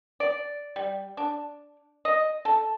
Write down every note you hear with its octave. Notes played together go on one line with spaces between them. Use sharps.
D5
G3
D4
D#5
A4